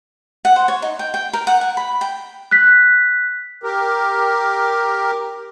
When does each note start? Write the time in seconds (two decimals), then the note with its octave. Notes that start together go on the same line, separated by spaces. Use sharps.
0.45 F#5
0.56 C5
0.68 C#5
0.82 D#4
0.99 G5
1.14 G5
1.33 A#4
1.47 F#5
1.61 G#5
1.77 B5
2.01 G5
2.51 F#6 B6
3.63 G4 A#4